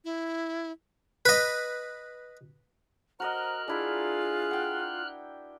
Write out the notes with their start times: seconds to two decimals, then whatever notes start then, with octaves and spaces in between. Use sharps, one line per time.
0.05 E4
1.25 B4 D#5
3.20 F#4 A#4 C5 D#5 A#5 F6 F#6
3.68 D4 E4 F4 G#4 A#4
4.51 F#5 G5